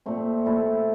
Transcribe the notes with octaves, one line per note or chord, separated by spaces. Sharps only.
A#2 A3 C4
A#2 A3 E4 A4